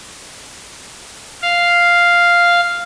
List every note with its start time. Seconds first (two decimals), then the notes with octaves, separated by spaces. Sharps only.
1.42 F5